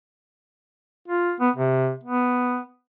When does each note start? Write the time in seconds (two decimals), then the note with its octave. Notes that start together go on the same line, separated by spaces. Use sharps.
1.08 F4
1.40 B3
1.56 C3
2.04 B3